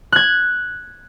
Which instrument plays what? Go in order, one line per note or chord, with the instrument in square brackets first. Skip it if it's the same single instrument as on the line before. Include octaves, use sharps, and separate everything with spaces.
[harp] F#6 G#6